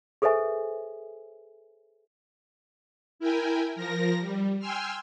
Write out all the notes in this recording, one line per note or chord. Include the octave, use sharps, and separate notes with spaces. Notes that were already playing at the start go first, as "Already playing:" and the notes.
G#4 A4 B4 C5 E5 G#5
E4 A#4 G5 G#5
F3 A#4 A#6
G3
G5 G#5 C6 E6 F6